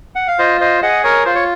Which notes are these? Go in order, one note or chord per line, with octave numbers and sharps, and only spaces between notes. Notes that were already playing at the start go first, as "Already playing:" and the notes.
F#5
F5
F4 C5 D#5
C5 D#5
G#4 D#5 F#5
A#4 C#5
F4 C5
C#5